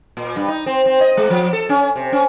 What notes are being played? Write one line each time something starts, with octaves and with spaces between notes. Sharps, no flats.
A#2
G2
D#4
C4
C4
D#5
G#3
F3
A4
C#4
C3
C#4